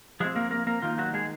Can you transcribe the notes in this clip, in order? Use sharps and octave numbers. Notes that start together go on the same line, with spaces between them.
F3 G#3 C4 G#4
A#3 A#4
A#3 A#4
A#3 A#4
D#3 A#3 D#4 F4
F#3 F#4
G#3 G#4